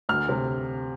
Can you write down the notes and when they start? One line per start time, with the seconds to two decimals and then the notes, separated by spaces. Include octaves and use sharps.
0.09 D2 F6
0.29 C3